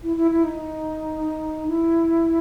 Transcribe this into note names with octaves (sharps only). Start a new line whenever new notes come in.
E4
E4
E4
D#4
E4